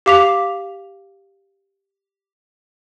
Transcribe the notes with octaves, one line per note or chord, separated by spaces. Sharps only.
G4 F5 D6 B6 F7